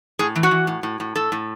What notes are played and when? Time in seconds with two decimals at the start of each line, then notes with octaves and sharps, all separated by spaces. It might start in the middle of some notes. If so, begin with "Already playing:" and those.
0.19 A2 G#4
0.36 E3
0.43 F#4
0.51 E3
0.67 A2
0.83 A2
1.00 A2
1.16 A2 A4
1.32 A2